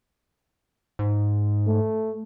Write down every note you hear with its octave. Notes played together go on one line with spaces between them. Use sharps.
G#2
A3